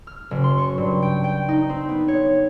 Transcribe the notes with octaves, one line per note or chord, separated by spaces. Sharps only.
F6
F#1
C6
C#6
G2
G5
G5
D#4
C4
B3
C#5